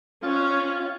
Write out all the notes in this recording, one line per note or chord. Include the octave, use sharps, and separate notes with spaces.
C#4 F4
F4